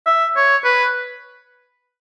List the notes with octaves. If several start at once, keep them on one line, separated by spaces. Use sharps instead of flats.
E5
C#5
B4